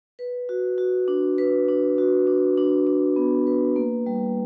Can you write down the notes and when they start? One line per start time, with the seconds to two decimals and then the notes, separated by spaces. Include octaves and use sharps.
0.19 B4
0.49 F#4
0.78 F#4
1.08 D4
1.38 B4
1.68 D4
1.98 F#4
2.27 D4
2.58 D4
2.87 D4
3.16 B3
3.47 B4
3.76 A#3
4.06 G3